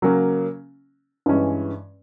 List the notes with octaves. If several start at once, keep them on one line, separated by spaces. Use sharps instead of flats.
C#3 F#3 A#3 C#4
G2 E3 G#3 C#4